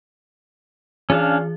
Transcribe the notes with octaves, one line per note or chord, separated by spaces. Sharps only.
E3 C#4 D4 G#4 F5